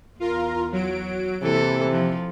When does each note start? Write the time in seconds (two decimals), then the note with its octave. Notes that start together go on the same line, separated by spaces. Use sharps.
0.20 E2 F4 A#4
0.72 F#3 D7
1.42 C3 E3 A#3 A4
1.89 F3